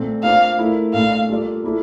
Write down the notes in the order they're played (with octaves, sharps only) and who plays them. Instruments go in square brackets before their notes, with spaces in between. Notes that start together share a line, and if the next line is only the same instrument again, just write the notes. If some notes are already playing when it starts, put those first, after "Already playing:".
Already playing: [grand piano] A#2 A3 C4
[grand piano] A#3 D4 F4 C5 [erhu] F5
[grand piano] A3 E4 A#4
[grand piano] A#2 A3 D4 [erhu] F5
[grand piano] G3 A#3 F4 A4 D5
A#3 E4 A4